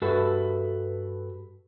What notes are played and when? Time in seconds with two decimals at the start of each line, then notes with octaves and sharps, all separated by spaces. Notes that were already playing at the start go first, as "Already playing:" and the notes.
0.02 G2 F#4 A4 B4 E5